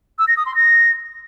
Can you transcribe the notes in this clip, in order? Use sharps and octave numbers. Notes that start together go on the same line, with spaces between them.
E6
A#6
D#6
C6
A#6